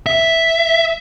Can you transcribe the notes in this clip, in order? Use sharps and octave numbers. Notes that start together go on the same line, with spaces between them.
E5